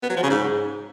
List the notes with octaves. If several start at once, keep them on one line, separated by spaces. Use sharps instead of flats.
B3
F#3
F3
C#3
G#2